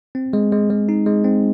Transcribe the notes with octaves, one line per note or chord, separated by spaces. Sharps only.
C4
G#3
G#3
G#3
D#4
G#3
C4